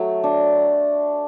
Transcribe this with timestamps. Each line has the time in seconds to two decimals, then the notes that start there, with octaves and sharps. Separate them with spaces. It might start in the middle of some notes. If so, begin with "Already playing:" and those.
Already playing: F#3 A3
0.24 D4